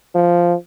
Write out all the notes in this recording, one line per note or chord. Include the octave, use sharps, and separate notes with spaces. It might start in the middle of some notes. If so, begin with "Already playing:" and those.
F3